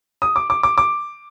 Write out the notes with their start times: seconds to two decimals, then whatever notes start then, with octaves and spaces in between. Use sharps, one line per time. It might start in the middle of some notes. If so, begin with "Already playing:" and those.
0.22 D#6
0.36 D6
0.50 D6
0.63 D6
0.78 D6